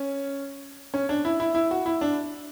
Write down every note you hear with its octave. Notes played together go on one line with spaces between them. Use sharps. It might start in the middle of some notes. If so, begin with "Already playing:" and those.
Already playing: C#4
C#4
D4
E4
E4
E4
F#4
E4
D4